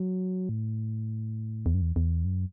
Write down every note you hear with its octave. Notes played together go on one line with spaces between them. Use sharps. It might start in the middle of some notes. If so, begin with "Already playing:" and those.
Already playing: F#3
A2
E2
F#2
E2
E2
F#2